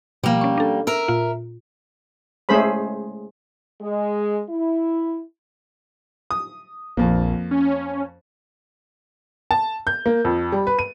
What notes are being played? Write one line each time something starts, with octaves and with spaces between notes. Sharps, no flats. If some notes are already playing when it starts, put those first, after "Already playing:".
B2 F3 G3 A#3
C#4 C#6
D4 A4
A#4 E5
A#2 F4
G#3 A3 C#4 G#4 C5 B5
G#3
E4
D#6
A#1 F2 A#3
C#4
A5
G6
A#3
F2
G3
B4
D#7